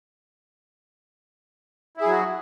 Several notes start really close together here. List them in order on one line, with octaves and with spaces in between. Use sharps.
E4 G#4 F#3 F#4